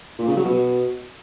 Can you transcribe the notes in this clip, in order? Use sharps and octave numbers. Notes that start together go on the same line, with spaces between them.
A#2
C#3
F#3
B2